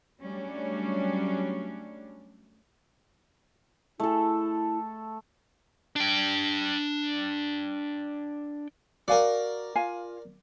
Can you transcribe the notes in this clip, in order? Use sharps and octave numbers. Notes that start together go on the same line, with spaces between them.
F#3 G3 A3 C#4 D4
A3 E4 A4
D4 G5
F#4 A#4 D5 F5 G#5
F4 F5 G#5